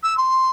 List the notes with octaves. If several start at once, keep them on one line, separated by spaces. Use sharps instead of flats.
E6
C6